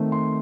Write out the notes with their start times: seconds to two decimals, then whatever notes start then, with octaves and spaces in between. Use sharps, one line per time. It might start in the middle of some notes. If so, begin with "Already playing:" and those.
Already playing: D#3 A3 C4
0.12 C6